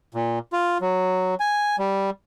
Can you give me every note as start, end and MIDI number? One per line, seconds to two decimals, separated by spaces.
0.14 0.39 46
0.53 0.78 65
0.81 1.35 54
1.40 1.76 80
1.79 2.10 55